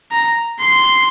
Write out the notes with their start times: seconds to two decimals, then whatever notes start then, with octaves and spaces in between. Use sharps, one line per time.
0.11 A#5
0.60 C6